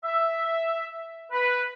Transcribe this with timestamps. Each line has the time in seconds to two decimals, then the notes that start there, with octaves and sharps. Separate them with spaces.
0.04 E5
1.32 B4